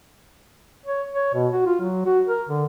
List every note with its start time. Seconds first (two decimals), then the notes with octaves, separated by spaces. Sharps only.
0.86 C#5
1.13 C#5
1.34 B2
1.52 F#4
1.66 F4
1.81 F#3
2.06 F#4
2.27 A#4
2.49 D3